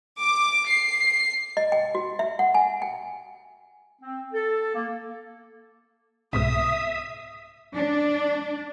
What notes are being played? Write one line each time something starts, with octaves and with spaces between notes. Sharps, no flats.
D6
C7
D#5
G5
F#4
E5
F#5
G#5
G5
C4
A4
A#3
C2 G#2 B2 E5 D#6
D4